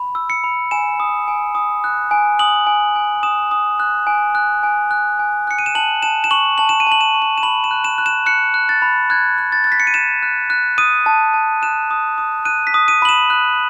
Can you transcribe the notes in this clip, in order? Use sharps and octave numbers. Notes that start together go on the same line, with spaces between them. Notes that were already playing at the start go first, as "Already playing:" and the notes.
Already playing: B5
E6
C#7
B5
G#5 E7
D#6
G#5
D#6
F#6
G#5
D#6 F#7
G#5
G#5
D#6 E7
D#6
F#6
G#5
F#6
G#5
F#6
G#5
F#6 C#7
D#7
E7
A5 F#7
A5 E7
E7
C#6 F#7
A5 F#7
E7
D#7
A5 F#7
E7
C#6
E7
E7
B5 F#7
E7
F#6
E7
F#6
E7
F#6 C#7
F#6
A6
B5
F#6 G#6
F#6
A6
A6
F#6 B6
C#7
D#7
F#6 E7
F#6
F#6
D#6 D#7
A5
A5
F#6 E7
D#6
D#6
F#6 D#7
B6
D#6
D#7
B5 F#7
E7
F#6